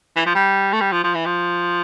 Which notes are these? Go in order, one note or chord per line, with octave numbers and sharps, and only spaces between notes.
E3
F3
G3
A3
G3
F3
F3
E3
F3